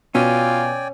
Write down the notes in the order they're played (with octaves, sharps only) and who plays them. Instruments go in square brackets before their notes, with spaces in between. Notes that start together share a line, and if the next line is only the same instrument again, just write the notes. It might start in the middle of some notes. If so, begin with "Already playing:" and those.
[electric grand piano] B2 E6 [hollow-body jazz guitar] C#4 [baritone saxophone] F4 [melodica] D5 G5 G#5